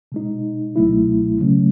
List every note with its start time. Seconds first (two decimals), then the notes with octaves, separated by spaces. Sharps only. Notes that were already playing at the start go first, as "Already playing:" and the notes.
0.12 B2 G#3 D#4
0.76 C#2 B2 F#3 A3 E4
1.40 C#3 F#3 A3 C#4